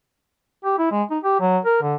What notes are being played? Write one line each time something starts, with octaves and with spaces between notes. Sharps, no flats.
G4
E4
G#3
D#4
G4
F#3
A#4
D3